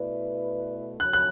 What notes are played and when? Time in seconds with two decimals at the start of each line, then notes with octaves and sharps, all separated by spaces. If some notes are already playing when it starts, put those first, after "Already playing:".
Already playing: B2 A3 E4 B4 D5
1.00 D3 F#3 F#6
1.13 F#6